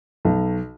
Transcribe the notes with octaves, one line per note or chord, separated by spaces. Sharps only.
B1